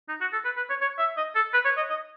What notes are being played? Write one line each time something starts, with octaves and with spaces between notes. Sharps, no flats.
D#4
F#4
A4
B4
B4
C#5
C#5
E5
D#5
A4
B4
C#5
D#5
D#5